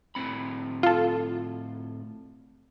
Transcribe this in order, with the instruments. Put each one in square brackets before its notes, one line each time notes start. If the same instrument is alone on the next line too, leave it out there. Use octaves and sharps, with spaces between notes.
[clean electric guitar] A2 C4 B5
[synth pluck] F4 A4